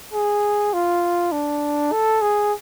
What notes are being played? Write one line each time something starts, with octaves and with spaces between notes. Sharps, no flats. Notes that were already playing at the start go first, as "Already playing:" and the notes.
G#4
F4
D4
A4
G#4